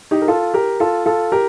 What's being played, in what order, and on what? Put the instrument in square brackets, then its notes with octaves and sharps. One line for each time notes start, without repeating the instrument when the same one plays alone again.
[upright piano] D#4 G4
A#4
F4 A4
G4 A#4
F4 A4
F4 A4
G4 A#4